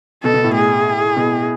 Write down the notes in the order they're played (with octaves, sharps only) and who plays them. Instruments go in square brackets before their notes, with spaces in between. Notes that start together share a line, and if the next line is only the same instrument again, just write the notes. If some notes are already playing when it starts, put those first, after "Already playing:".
[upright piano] B2 [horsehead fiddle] A4
[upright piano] B2
A2
[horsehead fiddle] G#4
[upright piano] B2